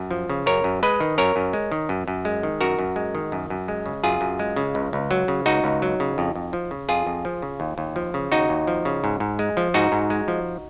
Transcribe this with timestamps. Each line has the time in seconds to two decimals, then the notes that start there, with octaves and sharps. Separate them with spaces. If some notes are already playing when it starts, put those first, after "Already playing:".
Already playing: F#2
0.11 F3
0.30 C#3
0.46 F#2 A#4 C#5
0.64 F#2
0.83 G#3 B4 D#5
1.00 D#3
1.18 F#2 A#4 C#5
1.36 F#2
1.53 G#3
1.72 D#3
1.89 F#2
2.08 F#2
2.25 G#3
2.43 D#3
2.61 F#2 F#4 A#4
2.79 F#2
2.96 G#3
3.15 D#3
3.32 F#2
3.50 F#2
3.68 G#3
3.86 C#3
4.03 F#2 F4 G#4
4.21 F#2
4.39 G#3
4.56 C#3
4.75 C#2
4.93 C#2
5.11 F#3
5.28 C#3
5.46 C#2 D#4 F#4
5.64 C#2
5.82 F#3
6.00 C#3
6.18 F2
6.35 F2
6.53 F3
6.71 C#3
6.89 F2 F4 G#4
7.06 F2
7.25 F3
7.42 C#3
7.60 D#2
7.78 D#2
7.96 F3
8.14 C#3
8.32 D#2 D#4 F#4
8.49 D#2
8.67 F3
8.85 C#3
9.04 G#2
9.20 G#2
9.39 G#3
9.57 F3
9.74 G#2 D#4 F#4
9.92 G#2
10.10 G#3
10.28 F3